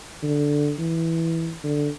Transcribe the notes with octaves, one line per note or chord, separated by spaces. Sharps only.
D3
E3
D3